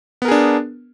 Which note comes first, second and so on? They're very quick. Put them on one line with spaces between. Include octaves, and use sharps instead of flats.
B3 A#4 G#4 D4